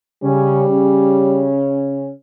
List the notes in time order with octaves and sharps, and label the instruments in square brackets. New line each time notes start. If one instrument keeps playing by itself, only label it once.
[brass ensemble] C#3 C#4 [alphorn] G3
[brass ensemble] C#3 C#4